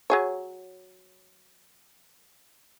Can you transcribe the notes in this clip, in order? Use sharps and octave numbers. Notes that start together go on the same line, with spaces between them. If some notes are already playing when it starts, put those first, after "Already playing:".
F#3 G#4 C#5